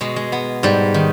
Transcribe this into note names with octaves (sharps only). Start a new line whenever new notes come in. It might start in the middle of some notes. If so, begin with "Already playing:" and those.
B2 G#3
G#3
B3
G#2 G3
D#3